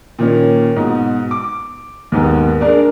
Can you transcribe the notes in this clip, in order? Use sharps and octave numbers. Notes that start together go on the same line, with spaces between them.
A#2 D#3 C#4
G#2 B2
D6
D#2 G#2 B3
G#3 D4 A#4 D5